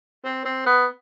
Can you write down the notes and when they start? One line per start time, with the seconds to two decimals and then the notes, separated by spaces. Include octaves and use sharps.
0.25 C4
0.45 C4
0.66 B3